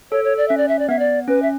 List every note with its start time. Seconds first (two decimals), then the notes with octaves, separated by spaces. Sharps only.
0.11 A4 C#5
0.24 C#5
0.37 D5
0.48 C#4 E5
0.57 D5
0.68 E5
0.79 D5
0.89 B3 E5
0.99 D5
1.28 C#4 B4
1.42 E5